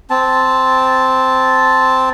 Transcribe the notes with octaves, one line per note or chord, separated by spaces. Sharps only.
C4 A5